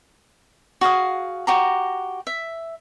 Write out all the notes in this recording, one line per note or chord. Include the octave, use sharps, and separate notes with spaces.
F#4 G#4 F5 D#6
F#4 G4 A#5
E5